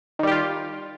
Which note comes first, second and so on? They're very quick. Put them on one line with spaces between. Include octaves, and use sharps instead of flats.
D#3 G3 G4 F4